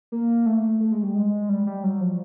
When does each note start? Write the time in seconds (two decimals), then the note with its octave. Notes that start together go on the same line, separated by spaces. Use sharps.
0.12 A#3
0.46 A3
0.80 A3
0.92 G#3
1.03 G3
1.15 G#3
1.49 G3
1.67 G3
1.84 F#3
2.01 F3